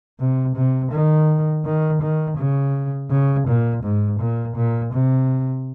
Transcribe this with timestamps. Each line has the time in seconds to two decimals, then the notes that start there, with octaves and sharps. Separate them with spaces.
0.19 C3
0.56 C3
0.92 D#3
1.65 D#3
2.02 D#3
2.37 C#3
3.10 C#3
3.48 A#2
3.83 G#2
4.20 A#2
4.56 A#2
4.93 C3